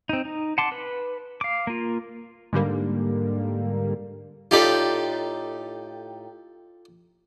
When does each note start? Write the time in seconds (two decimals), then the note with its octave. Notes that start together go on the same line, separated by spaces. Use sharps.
0.09 C4 D#4
0.25 D#4
0.58 F#5 A5 C6 D6
0.72 B4
1.41 F5 D6
1.67 A#3 F4
2.53 G#2 D3 G3 A#3
4.51 A2 D#4 F4 G4 A4 D5